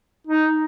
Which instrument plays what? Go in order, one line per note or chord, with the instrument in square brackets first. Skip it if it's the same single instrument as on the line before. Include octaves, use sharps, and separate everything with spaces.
[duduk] D#4